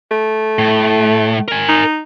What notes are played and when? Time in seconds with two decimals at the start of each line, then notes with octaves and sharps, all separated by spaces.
0.11 A3
0.59 A2
1.48 A#4 G#5
1.69 D#4